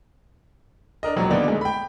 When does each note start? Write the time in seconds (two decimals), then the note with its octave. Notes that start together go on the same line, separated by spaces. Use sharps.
1.03 D4 A#4 D#5
1.16 E1 A#1 F#3
1.30 D3 D#3 A#3 B3 D4 D#4
1.48 G#3 A3
1.61 G5 B5